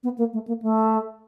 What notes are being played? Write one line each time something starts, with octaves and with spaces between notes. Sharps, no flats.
B3
A#3
A3
A#3
A3